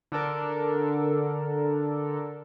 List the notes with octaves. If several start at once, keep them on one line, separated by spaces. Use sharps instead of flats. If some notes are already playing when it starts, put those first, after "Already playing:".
D3 D4 A4 A#4